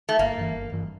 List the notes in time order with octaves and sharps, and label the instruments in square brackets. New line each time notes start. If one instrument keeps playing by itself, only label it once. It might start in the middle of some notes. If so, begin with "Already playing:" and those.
[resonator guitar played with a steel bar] A3
[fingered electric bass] G1 [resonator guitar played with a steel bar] A#3
[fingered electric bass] G2 E3
G1
G2 E3